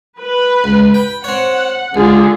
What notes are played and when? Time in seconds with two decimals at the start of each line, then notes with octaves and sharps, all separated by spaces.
0.20 B4
0.64 C#2
0.94 G5
1.24 C4 C#5 F#5
1.94 C#2 D3 F4 G#4